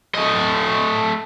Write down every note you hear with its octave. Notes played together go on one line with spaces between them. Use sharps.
A3 D#5